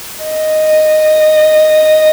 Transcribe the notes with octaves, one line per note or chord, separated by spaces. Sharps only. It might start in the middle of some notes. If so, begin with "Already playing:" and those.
D#5